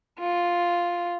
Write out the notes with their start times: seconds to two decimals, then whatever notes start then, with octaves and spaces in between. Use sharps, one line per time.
0.19 F4